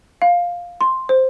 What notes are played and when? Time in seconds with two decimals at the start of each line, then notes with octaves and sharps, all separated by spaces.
0.22 F5
0.81 C6
1.09 C5